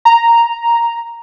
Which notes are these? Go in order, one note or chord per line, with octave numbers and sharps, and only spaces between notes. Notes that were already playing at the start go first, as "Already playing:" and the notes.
A#5